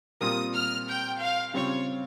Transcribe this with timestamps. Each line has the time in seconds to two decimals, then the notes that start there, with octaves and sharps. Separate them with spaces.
0.20 A#2 G3 C4 F4 A#4 D#6
0.54 F6
0.87 G5
1.21 F5
1.54 C#3 G3 C4 F4 C#5